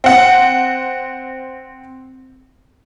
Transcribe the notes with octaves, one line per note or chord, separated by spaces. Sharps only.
C4 F#5